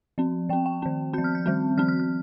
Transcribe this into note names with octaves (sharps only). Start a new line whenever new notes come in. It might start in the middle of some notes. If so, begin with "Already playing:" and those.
F3 C4
F3 C4 G5
G5
D#3 C4
F3 C4 G6
F6
G6
D#3 G3 C4
F3 C4 F6
F6
F6